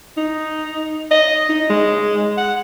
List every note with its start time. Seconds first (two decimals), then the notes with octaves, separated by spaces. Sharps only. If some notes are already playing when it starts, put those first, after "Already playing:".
0.17 D#4
1.11 D#5
1.50 D#4
1.70 G#3
2.38 F#5